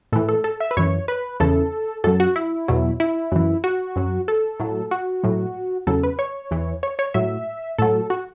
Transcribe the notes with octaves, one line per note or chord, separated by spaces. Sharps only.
A2 E3 A4
A4
A4
E5
B4
F#2 E3 C#5
B4
E2 C#3 E3 A4
F#2 F#3 A4
F#4
E4
E2 B2 F#3
E4
F#2 E3
F#4
F#2 F#3
A4
A2 F#3
F#4
A2 F#3
E2 C#3 F#3 A4
B4
C#5
E2 E3
C#5
C#5
A2 F#3 E5
A2 F#3 A4
F#4